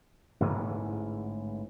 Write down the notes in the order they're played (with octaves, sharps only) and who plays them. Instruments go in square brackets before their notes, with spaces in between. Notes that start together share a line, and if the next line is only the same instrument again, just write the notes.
[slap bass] A1 G#2 D3 E3